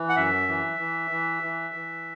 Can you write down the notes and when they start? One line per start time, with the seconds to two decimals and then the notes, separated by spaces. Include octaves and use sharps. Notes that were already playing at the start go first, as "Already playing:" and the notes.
Already playing: E3
0.09 F#5
0.16 F#2 E5
0.48 E3
0.79 E3
1.11 E3
1.43 E3
1.74 E3